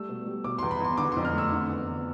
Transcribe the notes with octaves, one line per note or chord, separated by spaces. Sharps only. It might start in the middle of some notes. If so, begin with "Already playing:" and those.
Already playing: G3 A3 E6
B2
G3
B2 D6
E2 C6
B5
E2 C6
D3 D6
C6
F2
F6
A3 E6
D3
E2
E2